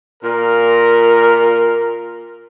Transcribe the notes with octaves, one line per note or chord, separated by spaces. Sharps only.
A#2 A#4